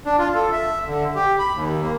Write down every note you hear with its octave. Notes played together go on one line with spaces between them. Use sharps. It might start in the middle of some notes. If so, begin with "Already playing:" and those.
D4
F4
A4
E5
D3
G4
B5
D#2
A#3